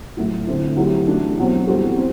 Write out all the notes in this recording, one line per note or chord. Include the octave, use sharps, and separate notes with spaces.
A2 F#3 A3 E4
D3 A3 C4 E4
F#3 A3 E4 G4
E3 A3 D4 F#4
B2 F#3 C4
E3 G3 C4 F#4 A4
C4